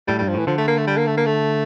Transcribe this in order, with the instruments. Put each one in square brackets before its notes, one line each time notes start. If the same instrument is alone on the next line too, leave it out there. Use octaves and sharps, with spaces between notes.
[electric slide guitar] A2 [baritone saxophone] G3
[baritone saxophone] G3
[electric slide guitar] G2
[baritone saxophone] F3
[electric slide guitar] A2 [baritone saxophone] E3
[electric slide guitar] D3 [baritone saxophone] F3
[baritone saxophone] A3
A#3
A3
G3
A#3
A3
A#3
A3